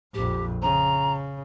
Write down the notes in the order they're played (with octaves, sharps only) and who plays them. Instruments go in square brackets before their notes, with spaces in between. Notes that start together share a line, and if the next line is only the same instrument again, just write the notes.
[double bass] A#1 F2 [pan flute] G4
[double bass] C#3 [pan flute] A#5